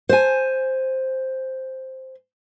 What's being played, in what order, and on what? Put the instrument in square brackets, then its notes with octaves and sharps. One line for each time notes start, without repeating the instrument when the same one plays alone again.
[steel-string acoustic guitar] C5 G#5